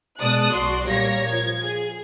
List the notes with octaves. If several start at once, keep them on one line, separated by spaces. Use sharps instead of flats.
B2 G#3 D5 A5 D#6 F#6
B1 F#4 D5 C6
A#2 G3 A#3 C#5 A#6
F3 G#6
G#4